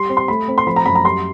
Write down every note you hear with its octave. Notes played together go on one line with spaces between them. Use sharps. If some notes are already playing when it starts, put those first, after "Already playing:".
Already playing: G3 C6
C4
C6
A3 B5
C4
C6
F3 B5
A#5
F#2 B5
A#5
G3 C6